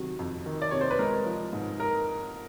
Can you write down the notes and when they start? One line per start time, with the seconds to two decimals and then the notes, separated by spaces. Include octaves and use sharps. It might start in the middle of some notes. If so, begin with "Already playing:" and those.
Already playing: C3 D#3 F#3
0.19 F2
0.46 D#3
0.62 D5
0.71 C3 C#5
0.81 C5
0.90 B4
0.99 G#3 A#4
1.26 F3
1.53 G#2
1.80 A#4